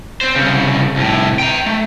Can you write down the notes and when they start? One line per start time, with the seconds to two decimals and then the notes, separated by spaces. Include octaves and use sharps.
0.21 C4 C5
0.36 C2 C#3
0.96 C2 A2
1.40 G5 A#5
1.66 A3